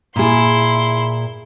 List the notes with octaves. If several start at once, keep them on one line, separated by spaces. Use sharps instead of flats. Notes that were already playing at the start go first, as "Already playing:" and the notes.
A#2 E4 G#4 C6